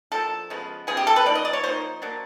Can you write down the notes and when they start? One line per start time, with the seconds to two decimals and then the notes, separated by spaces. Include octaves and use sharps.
0.12 F3 A#3 D4 A4
0.50 C#3 F3 G#3 B3
0.87 C#3 F3 G#3 B3 G#4
0.97 G4
1.07 A4
1.16 B4
1.25 F3 A#3 D#4 D5
1.35 D#5
1.45 D5
1.53 C#5
1.63 F3 A#3 D#4 C5
2.02 F#3 A#3 D4